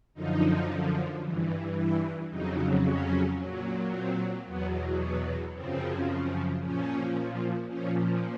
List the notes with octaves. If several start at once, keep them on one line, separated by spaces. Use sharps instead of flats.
F#2 D3 F3 D#4
G2 E3
E4
F2 C#3 F#3 D#4
C#4
A#2 F#3
C4
E2 B2 F#3 B3
B3
F#2 C#3 F3 C4
A#2 F3 C#4
A#2 F3 C#4